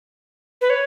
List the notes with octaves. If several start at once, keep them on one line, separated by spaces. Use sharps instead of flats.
B4
C#5